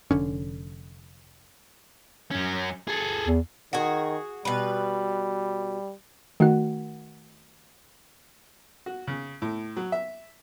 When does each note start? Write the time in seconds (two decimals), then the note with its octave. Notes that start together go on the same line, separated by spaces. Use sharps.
0.11 F1 D3 C#4
2.31 F#2 C#4
2.88 G#4 A4
3.27 E2
3.73 D#3 F#4 G#4
4.45 B2 G3 B4
6.40 D#3 A3 F#4 F#5
8.86 F#4
9.07 C#3
9.42 A2
9.77 F#3
9.92 E5